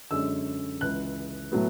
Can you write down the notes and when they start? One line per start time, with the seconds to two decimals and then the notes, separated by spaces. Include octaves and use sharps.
0.11 F#2 D3 G#3 C#4 E6
0.81 C#2 C#3 E3 F#6
1.52 A2 F#3 B3